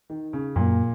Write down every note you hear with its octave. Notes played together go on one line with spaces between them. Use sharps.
D#3
C#3
F#2 A#2 F#3 A#3